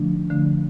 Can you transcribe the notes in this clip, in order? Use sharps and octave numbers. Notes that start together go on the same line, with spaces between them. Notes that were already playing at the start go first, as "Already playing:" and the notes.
Already playing: D3 F3 A3 D4
D3 F3 A3 D4